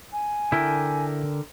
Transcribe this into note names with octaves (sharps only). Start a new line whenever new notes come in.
G#5
D3 E4 A#4 G5